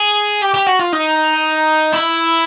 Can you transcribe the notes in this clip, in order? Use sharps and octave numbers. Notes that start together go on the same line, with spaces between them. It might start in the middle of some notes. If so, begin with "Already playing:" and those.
Already playing: G#4
G4
G4
F#4
F4
D#4
E4